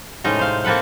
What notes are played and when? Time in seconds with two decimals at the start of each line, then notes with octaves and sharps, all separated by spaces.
0.24 A2 C3 G#3 C#4 D#4 A#5
0.39 C5 F5
0.64 A#3 C4 A4 B4 F#5